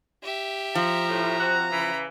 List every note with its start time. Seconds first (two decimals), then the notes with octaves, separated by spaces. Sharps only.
0.23 G4 E5
0.75 F3 A#5
1.08 A2
1.39 C4 F#4
1.71 C#3 E3 B5